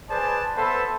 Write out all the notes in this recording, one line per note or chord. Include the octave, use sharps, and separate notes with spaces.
G#4 B4 C5 D5 G#5 A5
B3 A4 B4 C5 E5 A5